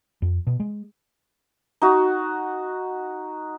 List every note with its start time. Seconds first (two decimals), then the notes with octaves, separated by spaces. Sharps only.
0.22 F2
0.47 B2
0.60 G#3
1.82 D#4 F#4